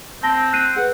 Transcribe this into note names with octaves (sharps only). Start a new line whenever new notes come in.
C4 A5 A#6 G7
F#6 C7 D#7
G#4 B4 F#5